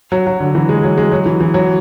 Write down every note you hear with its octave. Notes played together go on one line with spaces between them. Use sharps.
F#3
F#3
D3
E3
G#3
F#3
G#3
F#3
E3
E3
F#3